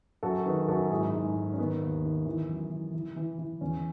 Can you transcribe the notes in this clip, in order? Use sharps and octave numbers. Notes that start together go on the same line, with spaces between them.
F#2 F#4 A4
D#3 G#4 B4
F#2 F#4 A4
G#2 E4 G#4
G#2
G#2
C#4
D#3 B3
D#2
D#3
E3
F#2
E3
E3
E3
E3
E2 C#4